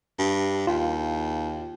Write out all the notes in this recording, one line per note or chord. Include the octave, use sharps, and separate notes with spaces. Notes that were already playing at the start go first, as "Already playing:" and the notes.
G2
D#2 F4